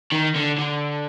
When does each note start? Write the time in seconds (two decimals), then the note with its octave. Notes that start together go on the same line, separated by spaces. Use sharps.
0.12 D#3
0.35 D3
0.58 D3